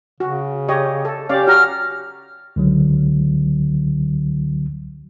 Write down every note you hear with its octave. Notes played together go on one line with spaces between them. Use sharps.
C#3 F#4
G4 C#5 D#5
A4
C#4 G4 D5 F5
F#4 A#5 F6
C#2 D3 F#3